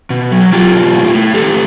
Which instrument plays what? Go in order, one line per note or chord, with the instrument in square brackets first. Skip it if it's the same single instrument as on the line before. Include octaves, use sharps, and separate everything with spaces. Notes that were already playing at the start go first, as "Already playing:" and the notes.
[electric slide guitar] B2
F#3
F#3 F4 G4
B2
A2
A2
A2 G4 A4